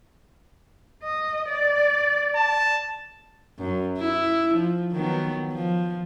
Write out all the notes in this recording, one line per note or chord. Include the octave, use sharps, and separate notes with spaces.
D#5
D5
A5
F#2
E4
F3
D#3 F#3 B3
F3